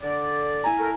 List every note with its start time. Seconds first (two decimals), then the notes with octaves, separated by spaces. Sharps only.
0.02 D3 D5
0.64 E4 G#5 A#5
0.78 A3 A#4